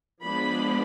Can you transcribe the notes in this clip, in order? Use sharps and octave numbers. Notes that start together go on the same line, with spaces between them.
F3 G#3 B3 D4 B5